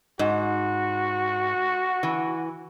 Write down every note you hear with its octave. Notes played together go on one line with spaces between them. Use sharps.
G#2 F#4
E3